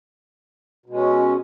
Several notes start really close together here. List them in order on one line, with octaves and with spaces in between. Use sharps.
B2 G#3 C#4